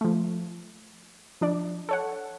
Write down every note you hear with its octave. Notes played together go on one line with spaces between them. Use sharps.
F3 A3
F3 D4 D5
A4 C#5 F#5